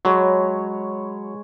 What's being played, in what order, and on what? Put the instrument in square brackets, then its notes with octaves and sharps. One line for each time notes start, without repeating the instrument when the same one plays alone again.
[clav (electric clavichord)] F#3 [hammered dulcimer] G#3 C#5 B5